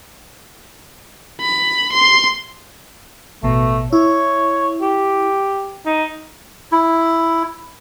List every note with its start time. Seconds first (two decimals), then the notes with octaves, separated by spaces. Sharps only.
1.41 B5
1.93 C6
3.43 A1 B2 A3
3.93 E4 C#5
4.82 G4
5.86 D#4
6.72 E4